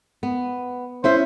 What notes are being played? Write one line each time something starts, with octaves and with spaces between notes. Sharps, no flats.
B3
C#4 E4 C5 E5